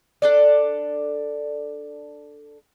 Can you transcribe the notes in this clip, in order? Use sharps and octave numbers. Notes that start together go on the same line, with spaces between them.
D4 A4 D5